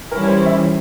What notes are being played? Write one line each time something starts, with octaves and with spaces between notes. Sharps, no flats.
E3 G3 C#4 E4 A#4
C5
E5